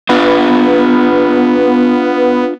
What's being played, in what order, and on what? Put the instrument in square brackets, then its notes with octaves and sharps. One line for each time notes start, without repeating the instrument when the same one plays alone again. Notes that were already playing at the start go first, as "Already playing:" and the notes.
[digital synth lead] B3 [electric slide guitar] D4 F4